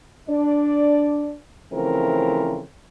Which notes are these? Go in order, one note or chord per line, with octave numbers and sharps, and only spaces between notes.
D4 D5
C#3 E3 F3 A3 C4 A#4